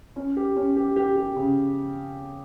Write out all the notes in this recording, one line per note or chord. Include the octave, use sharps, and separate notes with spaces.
C#4
G4
C#4
G4
G4
G4
C#3